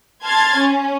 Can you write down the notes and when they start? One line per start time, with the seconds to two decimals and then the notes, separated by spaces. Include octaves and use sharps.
0.23 A5 C6 F6 G#6 A6
0.57 C#4